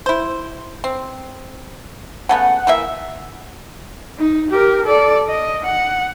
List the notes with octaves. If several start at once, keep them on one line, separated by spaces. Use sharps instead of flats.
E4 C5
C4
C#3 A3 B3 F#5
E3 A#3 E5
D#4
G4 A#4
A4 D5
D#5
F#5